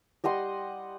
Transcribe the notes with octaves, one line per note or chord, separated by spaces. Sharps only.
G3 D#5 F#5 C6